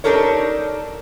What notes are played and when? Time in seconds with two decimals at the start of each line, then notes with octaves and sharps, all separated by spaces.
0.04 D4 D#4 G4 A4 A#4 C#5